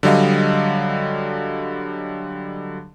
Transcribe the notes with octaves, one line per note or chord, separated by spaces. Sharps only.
D3 F#3 G3 D#5 F5